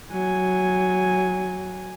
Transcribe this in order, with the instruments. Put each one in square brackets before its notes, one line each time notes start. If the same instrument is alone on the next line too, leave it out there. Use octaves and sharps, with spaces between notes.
[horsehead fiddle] F#3 G#5